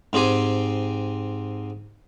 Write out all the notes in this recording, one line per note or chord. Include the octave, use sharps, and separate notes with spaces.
G#2 C4 G4 C5 G#5